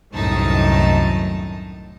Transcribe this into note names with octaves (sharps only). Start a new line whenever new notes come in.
C2 F#2 A2 D#3 D#4 A5